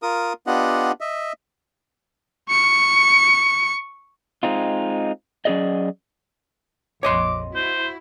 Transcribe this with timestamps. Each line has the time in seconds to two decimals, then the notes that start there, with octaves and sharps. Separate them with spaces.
0.02 F4 A#4 D#6
0.47 B3 D4 F4 G4 D#5 F#5
1.01 D#5 E5
2.50 C#6 C#7
4.43 G#3 C4 D#4 F4
5.45 F#3 C#4 D#4 G#4 D5 D#5
7.03 A#1 F2 C#5 D#5 C6 D6
7.55 E4 F#4 C5